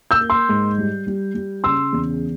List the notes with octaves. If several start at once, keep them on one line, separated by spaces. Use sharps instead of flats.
E6 G6
A#3
C6 E6
G#2
G3
G3
G3
C#3 C6 E6
E2